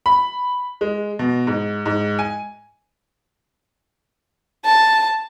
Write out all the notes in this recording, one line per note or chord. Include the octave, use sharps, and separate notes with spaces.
B5
G#3
B2
G#2
G#2
G#5
A5